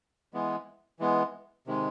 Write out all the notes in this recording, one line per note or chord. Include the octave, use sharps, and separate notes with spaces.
E3 G#3 B3
E3 G#3 B3
C3 D#3 G#3